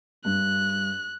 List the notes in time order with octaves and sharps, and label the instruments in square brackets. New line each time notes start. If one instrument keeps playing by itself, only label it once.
[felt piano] G2 [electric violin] F#6